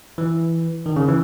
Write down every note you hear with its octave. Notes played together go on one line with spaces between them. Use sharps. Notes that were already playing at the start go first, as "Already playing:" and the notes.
E3
D#3
C#3
E3